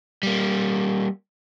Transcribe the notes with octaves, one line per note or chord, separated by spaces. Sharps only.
G3 A#3